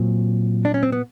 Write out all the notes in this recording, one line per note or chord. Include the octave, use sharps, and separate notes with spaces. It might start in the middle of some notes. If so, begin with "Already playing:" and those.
Already playing: A#2 F#3 C4
D4
C#4
C4
B3